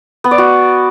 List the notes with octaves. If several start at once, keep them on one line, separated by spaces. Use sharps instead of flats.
B3
D5
F#4